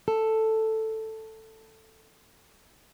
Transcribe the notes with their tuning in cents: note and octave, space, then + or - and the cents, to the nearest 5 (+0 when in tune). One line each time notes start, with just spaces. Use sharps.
A4 +5